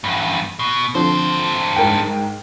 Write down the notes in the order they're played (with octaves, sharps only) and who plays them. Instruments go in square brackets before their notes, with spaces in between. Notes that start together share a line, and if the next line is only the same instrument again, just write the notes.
[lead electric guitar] E2 G2
B2
[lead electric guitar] G2 C5 [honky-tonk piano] D3 F3 C4
[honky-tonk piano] G#2 A#4 G5